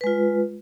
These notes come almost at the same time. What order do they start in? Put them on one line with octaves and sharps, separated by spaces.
B4 G#3 F4